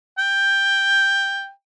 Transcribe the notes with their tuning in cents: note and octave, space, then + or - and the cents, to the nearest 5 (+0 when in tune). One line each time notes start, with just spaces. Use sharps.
G5 +10